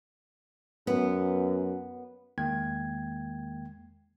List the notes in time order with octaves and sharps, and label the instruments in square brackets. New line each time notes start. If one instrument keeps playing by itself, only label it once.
[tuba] F#2 [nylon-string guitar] B3
[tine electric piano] E2 D#3 G#3 A#3 G5 G#6